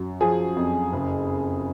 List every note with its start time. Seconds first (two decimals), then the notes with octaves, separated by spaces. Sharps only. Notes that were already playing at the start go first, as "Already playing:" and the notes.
Already playing: F#2
0.21 F3 G#4
0.56 F2
0.93 F#1